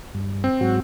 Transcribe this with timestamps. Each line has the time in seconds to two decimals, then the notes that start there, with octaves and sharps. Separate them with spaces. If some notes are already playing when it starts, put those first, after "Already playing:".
0.14 G2
0.44 C4
0.61 G#2 F#3 F#4